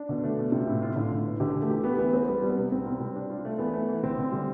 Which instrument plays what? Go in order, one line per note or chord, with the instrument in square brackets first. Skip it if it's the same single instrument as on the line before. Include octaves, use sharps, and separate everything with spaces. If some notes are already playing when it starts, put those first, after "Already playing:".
Already playing: [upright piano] D4
[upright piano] B2 [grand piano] D3
[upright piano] A3
B2
[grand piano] C3 [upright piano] F4
[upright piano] A2
F4
[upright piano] A2 [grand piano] D3
[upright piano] A2
B3
[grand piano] D3 [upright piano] G4
[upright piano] E3
[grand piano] A3
[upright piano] G4
[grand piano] B3 [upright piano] G4
[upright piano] E3 [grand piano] B3
[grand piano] B3 [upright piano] C4
[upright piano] G3 [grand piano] B3
[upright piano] G3
[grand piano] B3
[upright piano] C3
[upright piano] C2 [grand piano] C4
[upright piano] C2
G3
D4
F4
A3
[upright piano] E3 [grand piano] B3
[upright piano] A3
E3
[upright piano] D3 [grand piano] C4
[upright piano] D3
G3